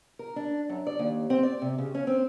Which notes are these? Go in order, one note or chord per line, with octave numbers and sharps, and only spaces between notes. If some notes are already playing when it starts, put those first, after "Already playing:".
A#4
D4
F#2
D5
D#2
C4
D5
C3
C#3
C#4
C4